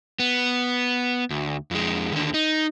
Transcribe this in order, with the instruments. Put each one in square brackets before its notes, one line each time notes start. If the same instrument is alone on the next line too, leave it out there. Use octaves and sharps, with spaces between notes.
[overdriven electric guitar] B3
D2
F2 G#3
D#2 D3
D#4